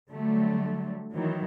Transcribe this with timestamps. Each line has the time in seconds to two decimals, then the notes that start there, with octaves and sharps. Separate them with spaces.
0.10 D3 F#3 G3 A3
1.13 D#3 E3 F#3